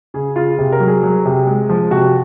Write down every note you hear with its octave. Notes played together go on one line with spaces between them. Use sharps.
C#3 G#4
C#3 F4
C3 G#4
A#4
F#3
G#4
F#3
C3
G#3
F3
C3 F#4